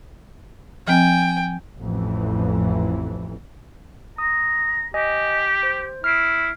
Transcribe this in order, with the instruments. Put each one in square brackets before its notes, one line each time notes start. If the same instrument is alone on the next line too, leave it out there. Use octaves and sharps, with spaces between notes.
[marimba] F3 C4 [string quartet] G5 G#5
[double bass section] A1 F2 E3
[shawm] A#5 [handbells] D#6
[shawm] G4 [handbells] D#5 G#5
[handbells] C5
[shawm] E4 [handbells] F6 C7 D7